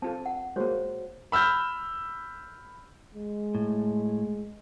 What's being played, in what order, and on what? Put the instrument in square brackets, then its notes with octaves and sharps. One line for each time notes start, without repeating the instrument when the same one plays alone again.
[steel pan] C4 F4 A4 [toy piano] A5
[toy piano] F#5
[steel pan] G#3 A#3 [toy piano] F#4 C5 C#5
[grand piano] B5 E6 F6 G6
[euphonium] G#3
[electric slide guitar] A2